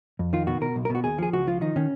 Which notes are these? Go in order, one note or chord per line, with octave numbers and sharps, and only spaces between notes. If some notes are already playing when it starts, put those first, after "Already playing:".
F2
D#3 F4
B2 F#4
B2 A#4
B1
A#4
B2 F#4
D#2 G#4
F3 G#4
C#2 F#4
F3 F4
D#3 D#4
D#3 C#4